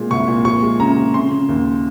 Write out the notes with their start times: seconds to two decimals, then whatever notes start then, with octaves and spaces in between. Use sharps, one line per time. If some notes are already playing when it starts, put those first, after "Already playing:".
Already playing: A#2 G#3
0.11 C2 C#6
0.28 A#2
0.45 F3 C#6
0.62 G#3
0.80 C#3 A#5
0.97 F3
1.14 C#3 C6
1.31 C#3
1.49 D#2